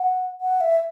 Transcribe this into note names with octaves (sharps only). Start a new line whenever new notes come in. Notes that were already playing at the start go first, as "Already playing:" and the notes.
Already playing: F#5
F#5
E5